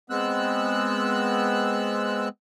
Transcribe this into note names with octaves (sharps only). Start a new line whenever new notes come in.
G#3 B3 C4 E6 F#6